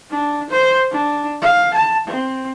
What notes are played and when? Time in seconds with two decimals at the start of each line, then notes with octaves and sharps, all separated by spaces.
0.10 D4
0.50 C5
0.92 D4
1.42 F5
1.74 A5
2.07 C4